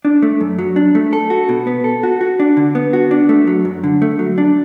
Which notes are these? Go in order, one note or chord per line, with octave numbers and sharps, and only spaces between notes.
D4
A3
F#2
F#3
D4
A3
A4
F#4
B2
B3
A4
F#4
F#4
D4
D3
B3
F#4
D4
A3
F#3
F#2
D3
A3
F#3
D4